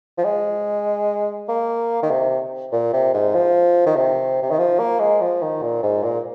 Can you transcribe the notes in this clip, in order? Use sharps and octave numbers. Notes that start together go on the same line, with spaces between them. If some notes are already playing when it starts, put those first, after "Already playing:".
F3
G#3
A#3
D#3
C3
A#2
C3
G#2
F3
D#3
C3
C3
D#3
F3
A#3
G#3
F3
D#3
A#2
G#2
A#2